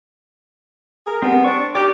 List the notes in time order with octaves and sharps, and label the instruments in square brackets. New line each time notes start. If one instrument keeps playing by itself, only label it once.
[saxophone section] G#4 A#4
[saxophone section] G3 B3 [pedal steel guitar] C4
[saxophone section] C4 D4 [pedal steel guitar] C#6
[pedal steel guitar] D#4 A#4 D5 [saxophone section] G4